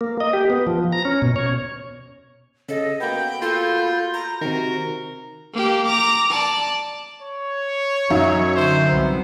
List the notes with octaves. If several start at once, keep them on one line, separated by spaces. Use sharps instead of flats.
A#3
D#5
G4
B3
F3
A#5
C#4
B2
C#5
C#3 A4 D#5
A#3 B3 F#4 G5 B5 G6
F4 A4
A#5
C3 D#3 F#4 A#4
A#3 G4
A#5 D6
D5 A5
C#5
F#2 F#3 D#4 E5
D3 C5
C2 B3